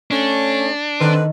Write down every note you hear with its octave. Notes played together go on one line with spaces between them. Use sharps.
A3 C#4 D4
D3 D#3 C4 A4 B4